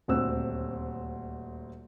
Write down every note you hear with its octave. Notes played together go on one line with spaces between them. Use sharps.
D#1 D2 C4 E6 F#6